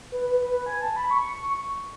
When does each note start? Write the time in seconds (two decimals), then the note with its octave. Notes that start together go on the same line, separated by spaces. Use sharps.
0.12 B4
0.31 B4
0.51 B4
0.66 G#5
0.82 A5
0.96 B5
1.11 C#6